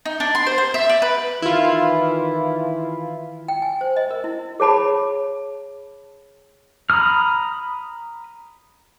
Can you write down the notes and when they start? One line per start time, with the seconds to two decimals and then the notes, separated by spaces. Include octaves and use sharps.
0.05 D#4
0.20 D4
0.35 C6
0.46 C5
0.58 C5
0.74 E5
0.89 D5
1.02 B4
1.42 D#3 E3 E4 F4
3.48 G5
3.62 G#5
3.81 C5
3.96 D#5
4.11 A#4
4.24 E4
4.60 G#4 C#5 A5 B5
6.90 A#5 B5 D#6 F6